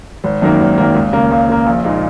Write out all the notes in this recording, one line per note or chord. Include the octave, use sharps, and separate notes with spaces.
G#1
F#2 D#3 A#3
G#1
F#2 D#3 A#3
C#2
C#3 A#3
C#2
C#3 A#3
A#1
A#2 G#3 D#4